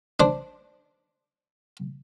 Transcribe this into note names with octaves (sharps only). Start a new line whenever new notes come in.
D4 C5